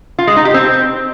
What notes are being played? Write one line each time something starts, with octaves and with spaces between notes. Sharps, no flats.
F4
G#3
D#4
G4
C4